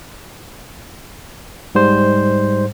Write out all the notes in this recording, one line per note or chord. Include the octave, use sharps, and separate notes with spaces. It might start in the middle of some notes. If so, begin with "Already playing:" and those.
G#2 G3 C5